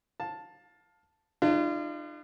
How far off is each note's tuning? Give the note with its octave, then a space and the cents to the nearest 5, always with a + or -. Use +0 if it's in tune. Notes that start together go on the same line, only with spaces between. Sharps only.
F5 +20 A5 +0
G#3 +0 D4 +40 F4 -35